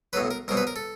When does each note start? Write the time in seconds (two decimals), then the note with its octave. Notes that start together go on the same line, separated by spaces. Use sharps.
0.13 B1 A2 F#3 B4
0.31 A#4
0.48 C2 B2 F#3 A#4
0.57 B4
0.67 A#4
0.76 A4